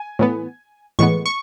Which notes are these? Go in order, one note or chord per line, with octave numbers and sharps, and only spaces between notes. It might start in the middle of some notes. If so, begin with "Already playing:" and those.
Already playing: G#5
A2 E3 B3
A2 E3 G#3 B3 C#6
C#6